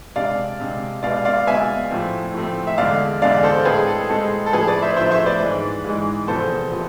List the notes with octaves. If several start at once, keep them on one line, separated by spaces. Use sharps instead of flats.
C3 G#3 D4 D5 F5
C3 G#3 D4
B2 G#3 B3 D5 F5
D5 F5
B2 G#3 B3 E5 G#5
A2 F3 A3 C4
A2 F3 A3 C4
E5
E2 D3 G#3 D4 D5 F5
E2 D3 G#3 D4 D5 F5
A4 C5
A2 G#3 C4 G#4 B4
A4
A2 G#3 C4 A4
A4
A2 F3 A3 D4 G#4 B4
B4 D5
C5 E5
A2 F3 A3 D4 C5 E5
C5 E5
B4 D5
G#2 E3 G#3
G#2 E3 G#3
E2 C3 F3 B3 A4 C5
C3 F3 B3